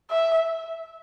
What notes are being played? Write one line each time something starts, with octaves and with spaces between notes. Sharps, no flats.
E5